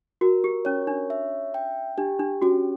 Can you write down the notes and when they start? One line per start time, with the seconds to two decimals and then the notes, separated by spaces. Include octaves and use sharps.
0.21 F#4 A#4
0.44 G4
0.65 C#4 C#5
0.87 D4
1.10 E5
1.54 G5
1.98 D4 G4
2.19 D4
2.42 C#4 F#4